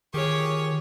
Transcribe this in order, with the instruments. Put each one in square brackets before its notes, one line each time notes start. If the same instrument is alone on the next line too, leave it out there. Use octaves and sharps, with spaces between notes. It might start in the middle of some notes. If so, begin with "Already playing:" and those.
[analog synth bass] D#3 [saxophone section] F4 G4 G#4 [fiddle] C#5